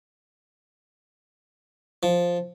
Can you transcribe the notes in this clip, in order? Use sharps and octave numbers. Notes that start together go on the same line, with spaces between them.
F3